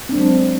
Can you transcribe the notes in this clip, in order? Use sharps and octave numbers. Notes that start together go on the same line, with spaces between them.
F#3 G#3 C4 D4